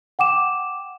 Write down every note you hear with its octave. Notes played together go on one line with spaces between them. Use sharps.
F#5 G5 D6 E7